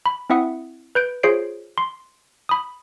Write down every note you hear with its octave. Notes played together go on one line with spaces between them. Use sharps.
B5
C4 E4 E5 F#5 D#6 C#7
B4 G6 D7
F4 G#4 C5 C#5 C7 D7
C6
B5 D#6